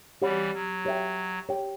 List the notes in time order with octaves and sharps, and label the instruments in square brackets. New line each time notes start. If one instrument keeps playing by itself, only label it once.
[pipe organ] E3 G3 [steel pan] G4 C#5 F#5 B5
[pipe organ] F#3
[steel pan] G4 C#5 E5 G5
G4 C#5 G5